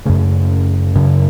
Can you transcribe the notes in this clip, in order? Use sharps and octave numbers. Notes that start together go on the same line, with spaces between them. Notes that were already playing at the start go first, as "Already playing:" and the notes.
F#2 C#3 A3
F#2 C#3